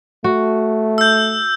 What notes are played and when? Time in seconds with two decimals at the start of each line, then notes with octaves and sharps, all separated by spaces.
0.24 A3 F#4
0.98 E6 G6